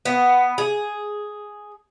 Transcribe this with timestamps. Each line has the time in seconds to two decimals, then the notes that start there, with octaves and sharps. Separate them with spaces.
0.05 B3
0.58 G#4